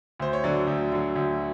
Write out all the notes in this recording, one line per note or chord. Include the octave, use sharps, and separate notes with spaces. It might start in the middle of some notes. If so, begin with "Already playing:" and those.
D2 C5
C#5
D3 F#3 D5
D2
D3 F#3
D2